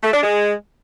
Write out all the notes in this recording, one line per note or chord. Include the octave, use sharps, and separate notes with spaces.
A3
D4
G#3